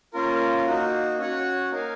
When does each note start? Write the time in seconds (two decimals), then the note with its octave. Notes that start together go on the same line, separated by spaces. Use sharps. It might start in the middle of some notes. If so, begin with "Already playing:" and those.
0.13 A#3 C#4 F4 A#4
0.66 A#3 D#4 F#4
1.18 C#4 F#4 C#5 F#5
1.71 A#3 D#4 A#4 F5 G#5